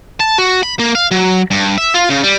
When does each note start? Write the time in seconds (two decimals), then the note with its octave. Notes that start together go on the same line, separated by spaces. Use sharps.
0.20 A5
0.38 F#4
0.63 B5
0.79 A#3
0.95 F5
1.11 F#3
1.51 G2
1.78 E5
1.94 F4
2.10 C#3
2.23 G3